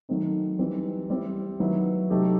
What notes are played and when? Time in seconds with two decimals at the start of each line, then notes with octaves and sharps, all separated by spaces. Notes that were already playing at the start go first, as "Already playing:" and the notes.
0.09 D#3 F#3 A3 C4 D#4
0.59 E3 G3 C4 D#4
1.10 G3 C4 E4
1.60 D#3 F#3 B3 E4
2.10 C3 F#3 A3 D#4 G4